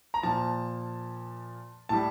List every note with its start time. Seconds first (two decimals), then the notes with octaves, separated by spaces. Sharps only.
0.14 A#5
0.23 A#2 F3 A5
1.89 A2 G3 A5